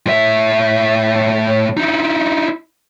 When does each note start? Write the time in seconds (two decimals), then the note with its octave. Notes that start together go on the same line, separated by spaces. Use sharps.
0.06 A2 E5
1.77 D#4 E4